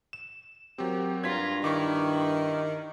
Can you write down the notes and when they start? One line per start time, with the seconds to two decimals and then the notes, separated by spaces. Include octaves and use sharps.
0.13 E7
0.78 F#3 C4 G4 A#4
1.24 G2 F4 A#5 G#6 B6
1.64 D#3 E4 C#6 D6